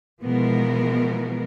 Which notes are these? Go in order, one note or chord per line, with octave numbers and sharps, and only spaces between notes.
B2 E3 F3 G#3 B3 A#4